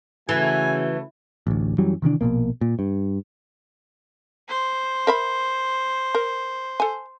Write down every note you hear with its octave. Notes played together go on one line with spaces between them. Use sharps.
C#3 E3 A3 F#4 G#5
A1 D2
F#2 E3 F#3 G3
C3 D#3 E3 D4
A#1 F#2 B2 A#3
A#2
G2
C5
A#4 E5 B5
A#4
A4 G#5